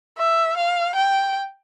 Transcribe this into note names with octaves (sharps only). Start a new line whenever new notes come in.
E5
F5
G5